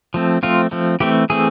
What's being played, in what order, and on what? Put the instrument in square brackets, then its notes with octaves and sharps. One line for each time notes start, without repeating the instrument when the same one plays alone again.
[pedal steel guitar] F3 A3 C4
F3 A3 C4 F4
F3 A3 C4
E3 A3 C4 G4
E3 A3 C4 G#4